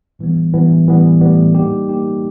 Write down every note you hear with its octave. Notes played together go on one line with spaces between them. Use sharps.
A2 E3 G3 B3
A2 E3 G3 B3
A2 E3 G3 B3
A2 E3 G3 B3
G3 A#3 D#4 G4
G3 A#3 D#4 G4